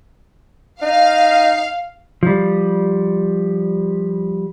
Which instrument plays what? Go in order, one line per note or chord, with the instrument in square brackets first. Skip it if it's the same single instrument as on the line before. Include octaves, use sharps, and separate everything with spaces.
[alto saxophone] D#4 [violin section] F5
[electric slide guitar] F3 G3